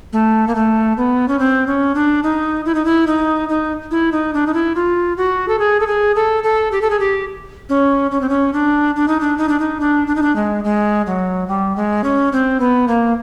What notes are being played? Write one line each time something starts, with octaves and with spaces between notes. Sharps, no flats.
A3
A#3
A3
B3
C#4
C4
C#4
D4
D#4
E4
D#4
E4
D#4
D#4
E4
D#4
D4
D#4
E4
F4
F#4
A4
G#4
A4
G#4
A4
A4
G4
A4
G#4
G4
C#4
C#4
C4
C#4
D4
D4
D#4
D4
D#4
D4
D#4
D4
D4
D#4
D4
G#3
G#3
F#3
G3
G#3
C#4
C4
B3
A#3